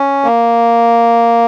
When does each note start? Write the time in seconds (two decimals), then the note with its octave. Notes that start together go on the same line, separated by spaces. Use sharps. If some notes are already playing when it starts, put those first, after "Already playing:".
Already playing: C#4
0.24 A#3